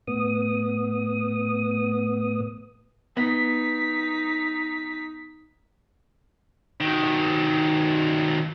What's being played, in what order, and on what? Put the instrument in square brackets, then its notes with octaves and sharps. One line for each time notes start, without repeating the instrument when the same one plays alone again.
[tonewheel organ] A2 B3 D#6
[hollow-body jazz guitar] B3 [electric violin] D#4 B6
[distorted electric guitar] D#3 F#3